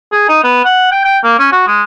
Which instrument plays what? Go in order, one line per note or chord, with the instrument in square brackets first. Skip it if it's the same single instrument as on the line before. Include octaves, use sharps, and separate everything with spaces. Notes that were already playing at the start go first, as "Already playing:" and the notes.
[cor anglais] G#4
D#4
B3
F#5
G5
G5
A#3
C#4
F#4
G#3